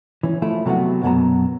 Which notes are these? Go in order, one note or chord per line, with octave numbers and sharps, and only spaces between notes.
E3 C#4
F3 A3 E4
C3 F#3 A3 B3 F#4
B1 F#2 F#3 B3 A5 A#5